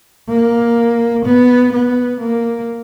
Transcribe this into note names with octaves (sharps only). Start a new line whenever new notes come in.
A#3
B3
B3
A#3